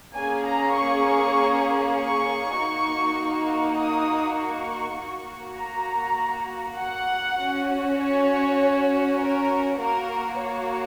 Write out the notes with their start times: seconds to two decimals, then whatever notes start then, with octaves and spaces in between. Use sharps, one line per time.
0.16 A#3 C#4 G#4 G#5
0.46 A#5
0.76 C#6
1.96 C#6
2.56 A#3 D#4 F#4
3.77 D#6
4.37 C#6
4.97 A#3 F#4
5.57 A#5
6.78 F#5
7.39 C#4 F#4
7.98 C#5
9.19 A#4
9.79 A#3 F#4 A#4
10.39 C#5